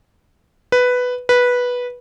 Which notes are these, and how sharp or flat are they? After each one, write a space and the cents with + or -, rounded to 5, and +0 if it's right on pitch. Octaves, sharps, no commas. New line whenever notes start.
B4 +5
B4 -10